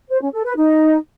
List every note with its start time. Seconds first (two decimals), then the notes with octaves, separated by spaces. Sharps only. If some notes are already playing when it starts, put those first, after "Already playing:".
0.09 C5
0.21 C#4
0.33 A4
0.44 B4
0.56 D#4